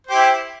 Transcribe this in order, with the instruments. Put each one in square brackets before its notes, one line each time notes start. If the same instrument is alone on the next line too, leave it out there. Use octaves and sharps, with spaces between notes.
[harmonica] C5
G4
E4